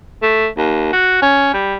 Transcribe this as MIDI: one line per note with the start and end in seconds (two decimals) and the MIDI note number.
0.22 0.48 57
0.57 0.88 39
0.93 1.20 66
1.22 1.52 61
1.53 1.76 55